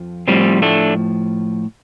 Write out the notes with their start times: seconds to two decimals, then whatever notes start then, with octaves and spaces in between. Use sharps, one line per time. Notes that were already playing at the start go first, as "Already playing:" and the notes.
Already playing: F2 F3
0.28 A2 F3 G3 C4
0.62 A3 D4